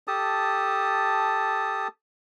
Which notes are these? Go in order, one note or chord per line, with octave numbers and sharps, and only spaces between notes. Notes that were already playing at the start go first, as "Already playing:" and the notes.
G4 A4 A5 D#6